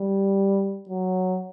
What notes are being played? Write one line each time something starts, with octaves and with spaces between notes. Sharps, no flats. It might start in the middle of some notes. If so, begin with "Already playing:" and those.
Already playing: G3
F#3